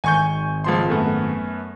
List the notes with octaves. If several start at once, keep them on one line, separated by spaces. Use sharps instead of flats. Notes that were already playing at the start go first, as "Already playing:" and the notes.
G#1 G#5 C#6 G6
C#2 F3 C6
F#2 A3 B3